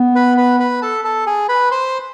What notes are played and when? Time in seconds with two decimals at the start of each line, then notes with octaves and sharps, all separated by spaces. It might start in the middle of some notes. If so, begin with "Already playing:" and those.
Already playing: B3
0.15 B4 B5
0.37 B4 B5
0.60 B4 B5
0.82 A4 A5
1.04 A4 A5
1.27 G#4 G#5
1.49 B4 B5
1.71 C5 C6